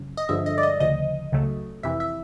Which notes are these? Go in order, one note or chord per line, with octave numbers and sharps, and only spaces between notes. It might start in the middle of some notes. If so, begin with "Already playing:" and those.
Already playing: F#2 C#3
D#5
G2 D3 F3 G#3 E5
D#5
D5
D#5
D2 C#3 F3 D#5
C#2 C#3 F#3 A3
F2 C3 E3 E5
E5